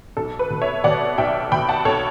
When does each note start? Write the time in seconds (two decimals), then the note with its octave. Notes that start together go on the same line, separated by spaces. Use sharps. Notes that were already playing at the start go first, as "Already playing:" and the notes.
0.17 B1 A4
0.39 B4
0.50 B2
0.62 C#5 E5
0.84 B2 D5 F#5
1.18 B1 E5 G5
1.52 B2 G5 B5
1.69 F#5 A5
1.85 B1 A4 C#5